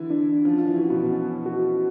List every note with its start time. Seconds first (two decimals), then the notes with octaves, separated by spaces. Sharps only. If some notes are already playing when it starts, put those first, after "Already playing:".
Already playing: D3 E3 E4
0.10 D4
0.45 F3 C#4 F4
0.58 F4
0.67 E3 E4
0.78 F#4
0.90 B2 B3
1.12 C#4
1.46 F#4